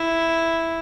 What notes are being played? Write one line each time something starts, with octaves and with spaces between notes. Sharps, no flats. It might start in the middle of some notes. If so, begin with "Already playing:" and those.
Already playing: E4